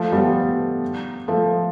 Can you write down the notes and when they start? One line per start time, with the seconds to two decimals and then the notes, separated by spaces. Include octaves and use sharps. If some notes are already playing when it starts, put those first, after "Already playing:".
Already playing: F3 A3
0.12 G3 B3
1.28 F3 A3